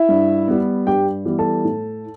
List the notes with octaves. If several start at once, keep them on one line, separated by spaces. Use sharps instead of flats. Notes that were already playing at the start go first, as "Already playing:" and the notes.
Already playing: E4 E5
G2
G3 B3
G2 G4 G5
E3 G3 B3
A4 A5
A2